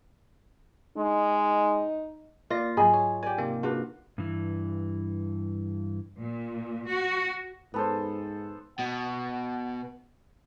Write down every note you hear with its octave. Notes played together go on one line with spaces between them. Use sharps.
G#3 D#4
A#3 F4 D5 A#6
G#2 F#3 G#4 D#5 G#5 B5
C#5
G4 D5 G#5
C3 A#3 D#4
D4 F4 F#4 G#4 B4
G2 E3
A#2
F#4
G#2 B3 A4 C5
B2 F#5